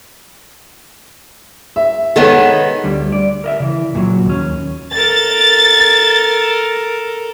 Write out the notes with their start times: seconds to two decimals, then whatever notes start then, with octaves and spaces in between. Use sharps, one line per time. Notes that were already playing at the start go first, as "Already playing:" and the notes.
1.76 E5
2.16 D#3 G#3 B3 A4 C#5
2.84 D2 D3 G3
3.12 D5
3.44 A#4 D#5 E5
3.60 C#3 E3
3.94 C#2 A#2 E3 F#3
4.25 D#2 C#4
4.94 A4 A#4 A6